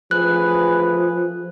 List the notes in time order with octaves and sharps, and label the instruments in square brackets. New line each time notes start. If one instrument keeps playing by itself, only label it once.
[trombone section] A1 G#4 B4 [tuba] F3 [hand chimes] F#6